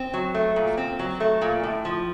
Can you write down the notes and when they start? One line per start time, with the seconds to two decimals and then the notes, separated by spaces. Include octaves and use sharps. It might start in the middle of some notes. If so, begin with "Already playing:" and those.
Already playing: C4
0.14 F#3
0.34 A3
0.56 A#2
0.77 C4
0.99 F#3
1.20 A3
1.42 A#2
1.64 A2
1.85 F3